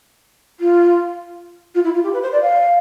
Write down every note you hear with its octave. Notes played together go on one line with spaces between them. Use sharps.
F4
F4
E4
F4
G4
B4
C5
D5
F5